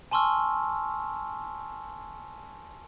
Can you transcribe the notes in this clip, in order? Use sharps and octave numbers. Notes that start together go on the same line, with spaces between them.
G#5 A5 C6 C#6 E6 F6